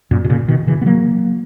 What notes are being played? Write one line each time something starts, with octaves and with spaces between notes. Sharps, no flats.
F#2 A#2
B2
A#2 C#3
B2 D#3
C#3 E3
B3
F#3 A#3